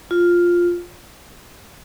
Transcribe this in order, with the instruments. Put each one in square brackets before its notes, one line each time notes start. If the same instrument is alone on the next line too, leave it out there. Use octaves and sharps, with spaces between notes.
[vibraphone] F4